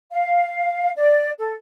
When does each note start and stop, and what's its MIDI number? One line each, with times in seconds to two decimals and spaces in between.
0.11 0.90 77
0.96 1.30 74
1.38 1.53 69